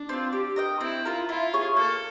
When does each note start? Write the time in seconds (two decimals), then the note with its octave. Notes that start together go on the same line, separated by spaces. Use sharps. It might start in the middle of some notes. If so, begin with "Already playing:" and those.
Already playing: D4
0.09 C4 F4
0.32 G4
0.56 A#4 D#5 G5
0.80 C4 E4
1.05 F4 A#4
1.29 E4 F4
1.53 G#4 C#5
1.77 A#3 A4